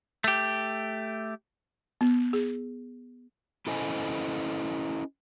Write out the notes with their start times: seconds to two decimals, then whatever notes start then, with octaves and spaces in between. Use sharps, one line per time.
0.24 A3 G4
2.01 B3
2.33 G#4
3.67 C#4 E4 A4 C5 D#5 G#5